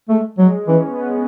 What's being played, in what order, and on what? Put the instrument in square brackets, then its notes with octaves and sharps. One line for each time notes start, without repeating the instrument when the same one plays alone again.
[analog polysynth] G#3 [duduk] A3
[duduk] F#3 [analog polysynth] G#3
[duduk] E3 [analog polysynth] C#4
[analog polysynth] B3
C#4
G#3